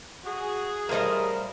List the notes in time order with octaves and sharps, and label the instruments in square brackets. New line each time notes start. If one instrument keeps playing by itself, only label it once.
[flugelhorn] F#4 [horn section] G#4
[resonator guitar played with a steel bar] A2 D#5 [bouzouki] G3 C5 F5 [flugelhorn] A#4